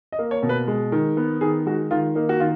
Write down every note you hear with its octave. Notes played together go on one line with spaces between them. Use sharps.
D#5
A#3
C#5
B2
B4
G#3
D#3
B3
D#3 G#4
G#3 F#4
D#3 F4
A#3 D#4
F#4
D#3 F4